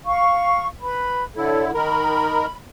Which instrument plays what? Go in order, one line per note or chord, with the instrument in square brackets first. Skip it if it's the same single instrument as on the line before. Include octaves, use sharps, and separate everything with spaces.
[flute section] F5 C#6
B4 B5
[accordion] D3 E4 [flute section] A4 C#5
[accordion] D#3 A#4 [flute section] B5